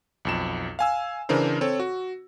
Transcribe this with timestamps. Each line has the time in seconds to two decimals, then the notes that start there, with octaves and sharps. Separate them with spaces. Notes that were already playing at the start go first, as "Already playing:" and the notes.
0.25 B1 F2 E7
0.79 F5 G#5 E6
1.29 C#3 E3 D4 A#4 C5
1.61 C4 A4 C#5
1.79 F#4